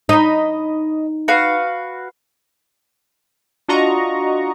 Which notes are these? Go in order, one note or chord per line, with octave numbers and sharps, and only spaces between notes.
D#4 D#5 B5
F#4 B4 F5
D4 F4 F#4 D#5 A#5 C#6